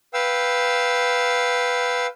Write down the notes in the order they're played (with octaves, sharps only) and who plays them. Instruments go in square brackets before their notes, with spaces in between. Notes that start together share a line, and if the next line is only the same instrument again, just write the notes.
[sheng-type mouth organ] B4 F5 G5 E6